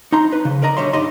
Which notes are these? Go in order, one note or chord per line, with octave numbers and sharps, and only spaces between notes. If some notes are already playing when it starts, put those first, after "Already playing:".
D#4 A#5 C6
B4
C#3
A#4 D5 D#5 A#5
B1 D3 G3 C#5 E5 C6
G2 D#4 G4 D5 D#5 C6